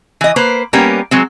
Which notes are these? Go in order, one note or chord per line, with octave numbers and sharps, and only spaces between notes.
E3 D#5
A#3 B4 C5
G3 A#3 B3 C#4 G4 A#4
F#3 G#3 C4